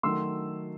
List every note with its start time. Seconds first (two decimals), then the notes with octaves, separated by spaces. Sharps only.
0.03 D#3 F#3 A3 C6 E6